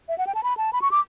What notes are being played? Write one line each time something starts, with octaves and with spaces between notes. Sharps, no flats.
E5
F#5
G5
A5
B5
A5
B5
C#6
D6